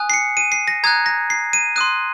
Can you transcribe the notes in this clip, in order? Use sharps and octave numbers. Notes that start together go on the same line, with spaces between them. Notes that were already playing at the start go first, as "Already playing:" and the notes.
Already playing: G#5 D#6 F#6
C7
C#7
D#7
C7
A#6
A#5 D#6 F#6 G#6
A#6
C7
D#7
C6 D#6 F#6 D#7